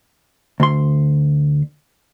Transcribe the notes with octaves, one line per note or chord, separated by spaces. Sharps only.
D2 C6